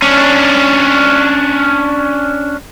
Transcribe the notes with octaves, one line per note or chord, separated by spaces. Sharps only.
C#4 D4